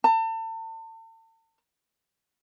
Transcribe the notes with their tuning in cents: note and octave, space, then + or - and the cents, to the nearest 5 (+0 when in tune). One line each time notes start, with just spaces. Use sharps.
A5 +40